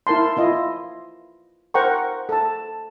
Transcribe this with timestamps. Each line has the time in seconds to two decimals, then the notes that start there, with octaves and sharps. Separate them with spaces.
0.07 E4 A#4 A5 C6
0.37 E4 F4 D#5
1.74 A#4 C5 F#5 G5 A#5 C#6
2.29 A4 A5